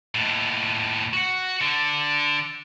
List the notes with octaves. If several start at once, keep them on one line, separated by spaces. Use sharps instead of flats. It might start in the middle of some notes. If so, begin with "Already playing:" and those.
D#2 A2
F#4 F#5
D3